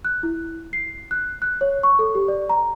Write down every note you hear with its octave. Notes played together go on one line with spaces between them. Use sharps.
F#6
E4
C7
F#6
F#6
C#5
C#6
A4
G4
D5
A#5